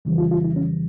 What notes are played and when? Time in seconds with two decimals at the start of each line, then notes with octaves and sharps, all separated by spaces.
0.05 F2 C#3 E3 G3
0.18 F4
0.31 F4
0.44 E4
0.56 C#4